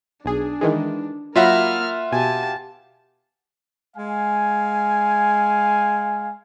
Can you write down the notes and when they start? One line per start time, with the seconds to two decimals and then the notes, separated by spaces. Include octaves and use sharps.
0.25 B1 D4 G#4
0.61 D#3 E3 G#3
1.36 F#3 A#3 F4 E5 F#5 B5 F6 A#6
2.12 B2 G4 G#5 A5
3.97 G#3 F5 G#5